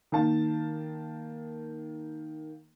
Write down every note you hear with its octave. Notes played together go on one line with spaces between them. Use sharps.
D#3 A#3 A5